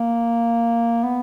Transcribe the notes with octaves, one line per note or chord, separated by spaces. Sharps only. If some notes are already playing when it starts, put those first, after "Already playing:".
Already playing: A#3
B3